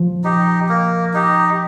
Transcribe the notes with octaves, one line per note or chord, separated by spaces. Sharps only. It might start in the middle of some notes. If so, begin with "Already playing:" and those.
Already playing: F3
D#4 G4
A#3
D#4 G4